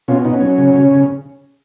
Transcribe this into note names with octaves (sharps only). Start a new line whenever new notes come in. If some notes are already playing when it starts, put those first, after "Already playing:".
B2 C#4 F4
B3 D#4
C#4
F#3
C#3
C#3
C#3